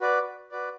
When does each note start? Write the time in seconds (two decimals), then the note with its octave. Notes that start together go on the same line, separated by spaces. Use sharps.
0.01 F#4 B4 D5
0.51 F#4 B4 D5